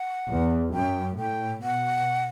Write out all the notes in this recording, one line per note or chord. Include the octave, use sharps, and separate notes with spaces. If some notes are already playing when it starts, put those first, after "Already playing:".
Already playing: F#5
E2
F#2 G5
A2 G5
B2 F#5